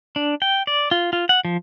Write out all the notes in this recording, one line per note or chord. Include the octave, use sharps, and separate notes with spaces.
D4
G5
D5
F4
F4
F#5
F3